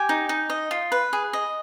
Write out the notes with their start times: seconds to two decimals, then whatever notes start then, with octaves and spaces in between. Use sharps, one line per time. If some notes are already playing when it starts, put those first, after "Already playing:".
Already playing: G4 G#5
0.09 D#4
0.29 D#4
0.50 D#5
0.71 F4
0.92 B4
1.13 G#4
1.33 D#5